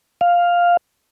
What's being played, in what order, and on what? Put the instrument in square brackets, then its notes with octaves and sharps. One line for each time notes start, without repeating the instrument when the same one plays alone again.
[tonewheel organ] F5